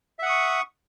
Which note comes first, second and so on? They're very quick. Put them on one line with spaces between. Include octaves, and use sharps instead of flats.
E5 F#5 D#6 C#6